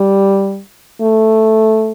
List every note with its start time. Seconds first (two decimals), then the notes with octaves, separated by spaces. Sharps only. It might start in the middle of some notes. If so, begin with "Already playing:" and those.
Already playing: G3
1.01 A3